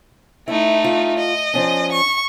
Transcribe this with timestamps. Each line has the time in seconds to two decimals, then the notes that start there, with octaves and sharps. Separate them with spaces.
0.48 A3 D#4 E4
0.84 F4
1.19 D#5
1.54 F3 C#4 D4
1.92 C#6